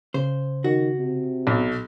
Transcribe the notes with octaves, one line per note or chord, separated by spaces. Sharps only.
C#3 C5
D#3 F#4
C3
B1